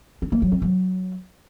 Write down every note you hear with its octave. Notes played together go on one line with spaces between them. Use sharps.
C4
A#3
F#3
C4
F#3